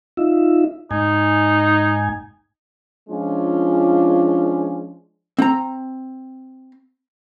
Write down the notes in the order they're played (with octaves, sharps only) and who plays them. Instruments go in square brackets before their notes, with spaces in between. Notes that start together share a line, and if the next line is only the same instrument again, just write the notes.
[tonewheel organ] D#4 F4 E5
[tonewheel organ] G#2 G#5 [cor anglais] D#4
[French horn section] F3 G#3 C#4 D4 F4
[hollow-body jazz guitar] C4 A#5